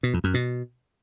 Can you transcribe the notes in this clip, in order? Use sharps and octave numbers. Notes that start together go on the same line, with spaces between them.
B2
F2
F#2
B2